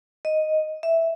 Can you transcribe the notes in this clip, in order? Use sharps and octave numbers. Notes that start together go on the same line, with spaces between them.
D#5
E5